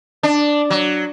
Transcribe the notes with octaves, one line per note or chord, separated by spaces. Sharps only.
D4
F#3